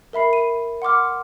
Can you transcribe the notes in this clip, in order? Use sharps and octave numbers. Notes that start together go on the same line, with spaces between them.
A#4 E5 B5 C7
D#7
F#5 C6 D6 F6